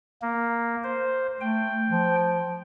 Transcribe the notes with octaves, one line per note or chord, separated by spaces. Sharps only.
A#3
C5
A3 G5
F3